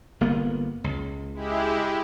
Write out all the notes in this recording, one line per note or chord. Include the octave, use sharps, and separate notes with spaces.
G1 A#3 B3
C#2
G#3 E4 G4